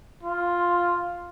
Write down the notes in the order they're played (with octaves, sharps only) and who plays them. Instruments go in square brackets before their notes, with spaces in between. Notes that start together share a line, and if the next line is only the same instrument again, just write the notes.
[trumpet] F4